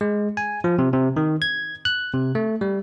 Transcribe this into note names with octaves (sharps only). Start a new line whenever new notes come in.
G#3
G#5
F3
C3
C3
D#3
G#6
F#6
C3
A3
G3